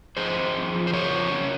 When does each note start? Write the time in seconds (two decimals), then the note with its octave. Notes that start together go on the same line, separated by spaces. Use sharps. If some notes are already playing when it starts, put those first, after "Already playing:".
0.17 F2 G#4 C5
0.36 C4
0.55 F2
0.75 F3
0.87 C5
0.93 C#3 A#4 C#5
1.13 F3
1.31 C#3